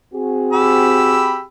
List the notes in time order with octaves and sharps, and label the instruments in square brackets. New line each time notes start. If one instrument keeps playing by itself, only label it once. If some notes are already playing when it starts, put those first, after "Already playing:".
[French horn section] C4 F#4 G#4
[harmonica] G4 B5 E6